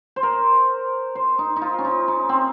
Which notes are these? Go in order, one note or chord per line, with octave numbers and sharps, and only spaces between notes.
C5
A#4
C5
D#4
D#4
F4
C#4
D#4
D#4
C4